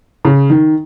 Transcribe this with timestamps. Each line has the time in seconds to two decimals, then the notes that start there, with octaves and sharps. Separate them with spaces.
0.25 C#3
0.50 D#3